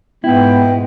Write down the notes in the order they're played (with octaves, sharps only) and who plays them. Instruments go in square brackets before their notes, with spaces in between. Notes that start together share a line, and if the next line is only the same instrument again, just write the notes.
[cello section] G#2 B2 G#3 [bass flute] B3 [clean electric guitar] E4 [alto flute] G5